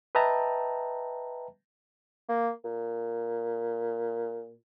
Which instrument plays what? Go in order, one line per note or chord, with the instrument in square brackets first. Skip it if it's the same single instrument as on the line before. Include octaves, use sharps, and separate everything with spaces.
[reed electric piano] B4 D#5 E5 G5 A5 A#5
[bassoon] A#3
A#2